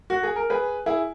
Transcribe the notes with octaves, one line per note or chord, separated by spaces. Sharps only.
F#4
G#4
A#4
G#4 B4
E4 G#4